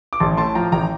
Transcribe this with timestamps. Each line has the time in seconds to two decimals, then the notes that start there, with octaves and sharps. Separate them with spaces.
0.13 D6
0.20 A1 A5 C6
0.37 A2 A5 C6
0.55 F3 G5 A#5
0.72 A1 G5 A#5